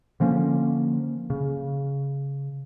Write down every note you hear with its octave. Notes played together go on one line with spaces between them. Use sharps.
D3 F3 A#3 C#4
C#3